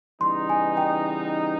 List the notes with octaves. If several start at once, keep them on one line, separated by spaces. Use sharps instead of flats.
C#3 E3 G3 B3 D#4 C6
G#5
G5